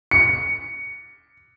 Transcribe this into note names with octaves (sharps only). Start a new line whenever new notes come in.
C#7